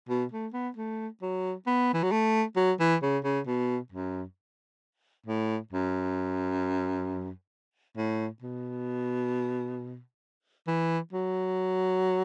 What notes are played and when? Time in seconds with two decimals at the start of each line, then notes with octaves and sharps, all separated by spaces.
0.09 B2
0.32 A3
0.53 B3
0.77 A3
1.22 F#3
1.67 B3
1.94 E3
2.03 F#3
2.11 A3
2.56 F#3
2.80 E3
3.02 C#3
3.24 C#3
3.47 B2
3.92 F#2
5.27 A2
5.73 F#2
7.97 A2
8.42 B2
10.67 E3
11.13 F#3